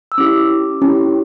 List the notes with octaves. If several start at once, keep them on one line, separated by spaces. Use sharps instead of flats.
E6
C#4 E4 G4 D6
C#4 E4 G4